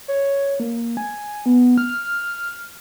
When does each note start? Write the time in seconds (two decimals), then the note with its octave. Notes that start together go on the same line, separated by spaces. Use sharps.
0.08 C#5
0.60 A#3
0.97 G#5
1.46 B3
1.78 F6